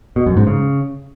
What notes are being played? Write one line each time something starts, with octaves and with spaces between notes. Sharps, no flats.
B2
F#2
G#2
C#3